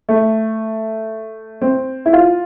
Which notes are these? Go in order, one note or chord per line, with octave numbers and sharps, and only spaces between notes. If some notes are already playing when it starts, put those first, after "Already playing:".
A3
C4
E4
F4